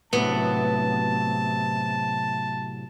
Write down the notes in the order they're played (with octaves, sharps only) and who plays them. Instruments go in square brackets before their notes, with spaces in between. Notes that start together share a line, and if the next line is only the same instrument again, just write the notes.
[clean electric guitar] A2 C3 F#3 [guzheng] B3 [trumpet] A5